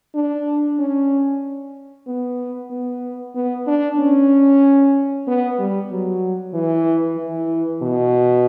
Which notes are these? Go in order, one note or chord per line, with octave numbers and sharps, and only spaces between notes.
D4
C#4
B3
B3
B3
D4
C#4
B3
G3
F#3
E3
E3
B2